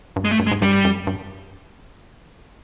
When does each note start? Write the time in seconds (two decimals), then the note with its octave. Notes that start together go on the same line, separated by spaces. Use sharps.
0.16 G2
0.25 G#3
0.31 A3
0.39 G2
0.47 G#3
0.51 G#2
0.62 G2 G3
0.85 F#2
1.07 G2